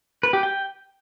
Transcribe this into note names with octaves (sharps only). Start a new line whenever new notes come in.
B4
G4
G5